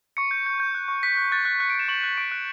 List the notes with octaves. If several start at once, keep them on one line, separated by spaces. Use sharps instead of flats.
C#6 C#7
G6
G6
G6
F#6
C#6
F#6 B6
F#6
F#6 A6
F#6
F#6 C#7
D7
F#6 E7
C#6 F#7
F#6
C#6 D7
F#6